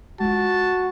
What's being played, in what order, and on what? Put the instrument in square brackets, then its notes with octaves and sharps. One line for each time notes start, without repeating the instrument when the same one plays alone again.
[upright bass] G#3 F4 [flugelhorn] F#4 [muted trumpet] A5